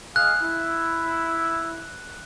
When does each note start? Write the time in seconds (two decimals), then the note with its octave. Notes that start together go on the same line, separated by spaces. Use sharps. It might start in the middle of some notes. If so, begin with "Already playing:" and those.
0.16 G#4 D#5 F5 F#6
0.42 E4